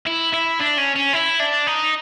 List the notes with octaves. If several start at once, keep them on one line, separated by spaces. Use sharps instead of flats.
E4
E4
D4
C#4
C#4
E4
D4
D#4